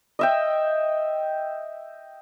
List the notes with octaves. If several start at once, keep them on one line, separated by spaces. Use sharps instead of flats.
D#5 E5 G5